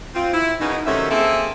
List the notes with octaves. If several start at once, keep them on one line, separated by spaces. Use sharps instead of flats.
C4 F4
E4
F#2 C#3 B3 D#4
F#2 C3 D#3 A3 C#4 E5
A#3 C4 G#4 A4 E5